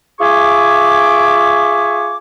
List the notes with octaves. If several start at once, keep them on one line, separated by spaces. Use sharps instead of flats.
F4 G#4 E5 G#5 C#6 D6